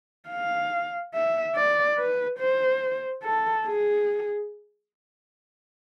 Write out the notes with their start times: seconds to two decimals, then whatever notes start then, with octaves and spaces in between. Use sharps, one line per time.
0.29 F5
1.14 E5
1.56 D5
1.98 B4
2.39 C5
3.23 A4
3.66 G#4